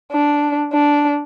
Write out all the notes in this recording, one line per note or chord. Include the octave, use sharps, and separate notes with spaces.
D4
D4